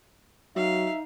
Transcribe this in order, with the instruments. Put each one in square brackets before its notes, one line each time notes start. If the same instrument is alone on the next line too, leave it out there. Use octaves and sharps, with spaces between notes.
[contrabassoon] F#3 [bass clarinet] D#4 [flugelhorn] E5 [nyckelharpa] F5